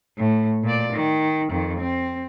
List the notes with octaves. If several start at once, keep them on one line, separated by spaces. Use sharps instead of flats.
A2
A#2 D5
D#3
F2 D#3
C4